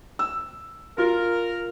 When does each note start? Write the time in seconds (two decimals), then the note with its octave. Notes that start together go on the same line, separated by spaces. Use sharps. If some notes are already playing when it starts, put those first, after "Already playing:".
0.19 E6
0.98 F4 A#4